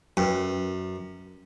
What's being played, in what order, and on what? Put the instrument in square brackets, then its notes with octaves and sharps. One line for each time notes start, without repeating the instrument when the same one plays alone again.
[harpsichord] F#2 [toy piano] C#4 A#4 B4